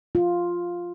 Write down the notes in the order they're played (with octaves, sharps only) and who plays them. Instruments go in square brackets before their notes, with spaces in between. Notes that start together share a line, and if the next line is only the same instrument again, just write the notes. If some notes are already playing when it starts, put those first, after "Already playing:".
[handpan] F4